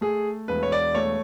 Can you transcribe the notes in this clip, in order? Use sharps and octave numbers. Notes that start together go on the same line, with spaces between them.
A3 G#4
E1 B4
C#5
D5
A3 C#5